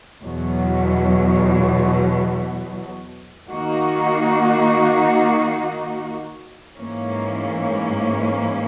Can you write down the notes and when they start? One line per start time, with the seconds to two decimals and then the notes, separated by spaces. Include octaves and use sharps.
0.23 E2 B2 F#3
3.50 D#3 A#3 D#4 F#4
6.76 G#2 E3 A#3 C#4